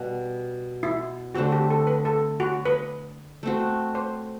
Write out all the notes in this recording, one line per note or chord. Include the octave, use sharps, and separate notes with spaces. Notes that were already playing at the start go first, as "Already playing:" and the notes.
Already playing: B2 G3
E4
D3 A3 C4 F#4
G4
A4
B4
A4
F#4
B4
A3 C4 F#4
C5